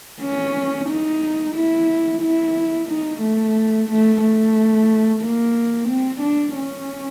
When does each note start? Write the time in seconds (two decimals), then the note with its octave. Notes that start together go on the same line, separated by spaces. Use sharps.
0.21 C#4
0.89 D#4
1.55 E4
2.21 E4
2.89 D#4
3.21 A3
3.89 A3
4.22 A3
5.22 A#3
5.88 C4
6.21 D4
6.55 C#4